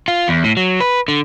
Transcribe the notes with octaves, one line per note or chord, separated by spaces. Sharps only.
F4
E2
A2
F#3
B4
D3